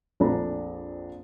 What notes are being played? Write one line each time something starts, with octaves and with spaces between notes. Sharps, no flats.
A#1 F2 D4 A4 A#5 B5